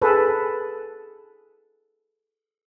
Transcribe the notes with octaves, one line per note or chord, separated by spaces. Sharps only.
G#4 A4 B4